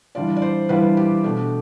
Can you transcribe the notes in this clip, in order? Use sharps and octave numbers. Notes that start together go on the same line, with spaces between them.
E3 G3 D4 F4 D5
D5
C5
E3 G3 D4 F4 B4
G4
B2 A3 D4 G4